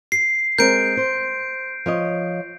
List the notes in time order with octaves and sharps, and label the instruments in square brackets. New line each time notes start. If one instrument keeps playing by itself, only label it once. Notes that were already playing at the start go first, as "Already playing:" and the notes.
[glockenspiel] C7
[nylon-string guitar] G#3 C4 A#4 [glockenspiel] G6 D7
[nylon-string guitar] C5
F3 C#5 D#5